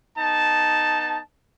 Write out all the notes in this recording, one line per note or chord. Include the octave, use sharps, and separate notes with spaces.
B3 D#4 A5